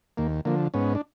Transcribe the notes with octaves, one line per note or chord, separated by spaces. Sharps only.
D#2 A#3
D3 F3 A#3
G#2 B3 C#4
D4